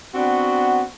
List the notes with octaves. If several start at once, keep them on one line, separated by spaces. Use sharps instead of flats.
B3 C4 D4 F#4